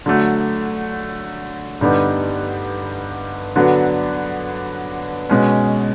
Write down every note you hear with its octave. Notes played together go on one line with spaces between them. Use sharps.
D3 F#3 A3
G2 D3 G3 B3 D#4
D3 F#3 B3 D4
B2 G#3 C#4